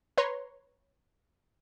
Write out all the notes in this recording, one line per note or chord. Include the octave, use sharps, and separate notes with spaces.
B4 C#5 A#5 C6